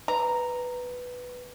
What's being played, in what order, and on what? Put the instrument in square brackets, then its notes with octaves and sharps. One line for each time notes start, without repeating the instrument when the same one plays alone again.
[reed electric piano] B4 [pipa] A#5